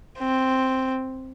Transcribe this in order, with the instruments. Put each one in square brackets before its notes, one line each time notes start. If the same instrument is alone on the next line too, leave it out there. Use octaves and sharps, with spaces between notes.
[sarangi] C4